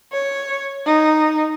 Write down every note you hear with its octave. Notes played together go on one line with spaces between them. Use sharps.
C#5
D#4